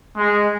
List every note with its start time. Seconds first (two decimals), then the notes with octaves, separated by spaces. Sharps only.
0.16 G#3